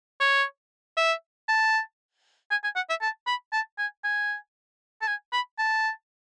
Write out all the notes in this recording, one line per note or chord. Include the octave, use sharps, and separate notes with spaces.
C#5
E5
A5
G#5
G#5
F#5
E5
A5
B5
A5
G#5
G#5
A5
G#5
B5
A5